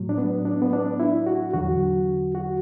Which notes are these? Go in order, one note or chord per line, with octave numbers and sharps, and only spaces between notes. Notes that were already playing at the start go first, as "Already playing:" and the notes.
Already playing: A2 F#3
D4
B3
D4
B3
D4
E4
F#4
E2 D3 F#3 F#4
F#4